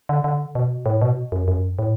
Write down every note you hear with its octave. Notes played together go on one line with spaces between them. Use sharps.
D3
D3
B2
A2
B2
F#2
F#2
A2